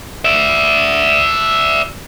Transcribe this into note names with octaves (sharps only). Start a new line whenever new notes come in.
D5 E5